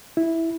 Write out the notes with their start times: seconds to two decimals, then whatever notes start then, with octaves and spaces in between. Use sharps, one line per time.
0.17 E4